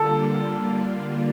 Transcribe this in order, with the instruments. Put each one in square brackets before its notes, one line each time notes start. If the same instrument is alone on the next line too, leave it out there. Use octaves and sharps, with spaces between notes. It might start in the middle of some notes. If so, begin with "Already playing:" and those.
Already playing: [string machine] D3 G3 A#3 D4 F4 [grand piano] A4